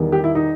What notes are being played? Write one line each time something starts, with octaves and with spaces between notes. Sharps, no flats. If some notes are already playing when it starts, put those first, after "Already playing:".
Already playing: E2 D#3 G3
G4
E4
D#4